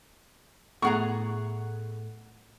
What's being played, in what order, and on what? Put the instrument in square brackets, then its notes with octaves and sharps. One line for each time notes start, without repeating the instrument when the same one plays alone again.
[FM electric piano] A2 A3 [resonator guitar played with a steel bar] B3 G#4 A#5 [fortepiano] F#5 C#6